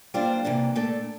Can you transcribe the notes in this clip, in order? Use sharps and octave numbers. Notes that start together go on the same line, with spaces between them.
G3 A#3 D4 F4 C5
C3 E3 A#3 D4
A#2 A3 D4 A4